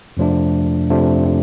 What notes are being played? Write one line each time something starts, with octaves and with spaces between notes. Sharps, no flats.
F2 C3 F3 A3 D4
F2 C3 F3 A3 D4